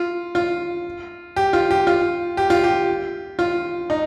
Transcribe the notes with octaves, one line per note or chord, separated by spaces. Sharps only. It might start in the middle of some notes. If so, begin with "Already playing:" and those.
Already playing: F4
F4
G4
F4
G4
F4
G4
F4
G4
F4
D#4